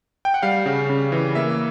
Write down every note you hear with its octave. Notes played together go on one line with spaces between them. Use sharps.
G5
F#5
G3 F5
C#3
C#3
E3
A#3 E5